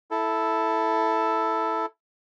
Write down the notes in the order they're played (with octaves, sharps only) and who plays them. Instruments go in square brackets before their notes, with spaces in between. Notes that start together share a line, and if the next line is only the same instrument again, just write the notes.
[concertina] E4 A4